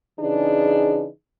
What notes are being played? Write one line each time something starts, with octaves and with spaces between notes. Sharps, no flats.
C#3 E3 D4 D#4 G#4